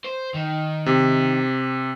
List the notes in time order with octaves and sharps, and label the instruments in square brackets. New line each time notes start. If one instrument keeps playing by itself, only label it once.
[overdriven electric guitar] C5
D#3
[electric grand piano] C3